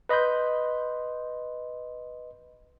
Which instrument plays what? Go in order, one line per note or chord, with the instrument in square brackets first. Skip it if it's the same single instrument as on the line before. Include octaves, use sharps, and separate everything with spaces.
[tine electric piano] B4 D#5 B5 C6 G6